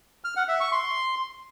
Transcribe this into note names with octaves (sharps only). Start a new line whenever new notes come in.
F6
F#5
E5
C#6
C6